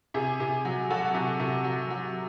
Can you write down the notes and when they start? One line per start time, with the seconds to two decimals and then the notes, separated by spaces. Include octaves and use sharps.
0.14 C3 G#4
0.40 C3
0.65 F#3
0.90 F#3 F#4 A4
1.14 C3
1.40 C3
1.64 F#3
1.90 F#3